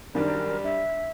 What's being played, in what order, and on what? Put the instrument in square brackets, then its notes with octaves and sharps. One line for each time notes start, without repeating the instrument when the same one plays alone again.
[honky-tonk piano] F#2 D#3 D4 [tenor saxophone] G3 [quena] A#4
[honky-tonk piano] D4 [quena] E5